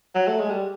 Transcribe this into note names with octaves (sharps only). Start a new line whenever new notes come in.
F#3
A3
G#3
G3